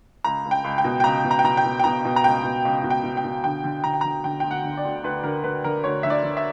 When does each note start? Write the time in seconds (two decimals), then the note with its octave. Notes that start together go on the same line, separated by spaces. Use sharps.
0.24 C#2 A#5
0.45 C#2
0.51 G5
0.64 C#2
0.78 G5
0.84 B2
1.00 G5
1.04 C#2 A#5
1.24 B2
1.31 A#5
1.39 G5
1.44 B2 A#5
1.57 G5
1.65 B2
1.79 G5
1.84 B2 A#5
2.05 B2
2.16 A#5
2.24 C#2 G5
2.44 B2
2.65 C#2
2.84 B2
2.90 G5
3.04 B2
3.17 G5
3.24 B2
3.44 D3 G5
3.64 D3
3.84 D3 A#5
3.94 G5
4.01 D3 A#5
4.24 D3 G5
4.40 D2 G5
4.51 F#5
4.64 D3
4.77 D5
4.85 D2
5.04 D2 B4
5.24 D3 A#4
5.44 D3 B4
5.64 D3 A#4
5.84 D2 C#5
6.03 D3 E5
6.10 D5
6.23 D3
6.37 E5